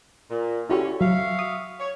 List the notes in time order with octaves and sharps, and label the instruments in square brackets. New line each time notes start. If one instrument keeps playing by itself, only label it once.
[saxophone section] A#2
[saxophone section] D3 C#4 [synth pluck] E4 F#4 G4
[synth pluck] F#3 [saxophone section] F#4 E5 F5
[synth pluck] D#6
[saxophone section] C#5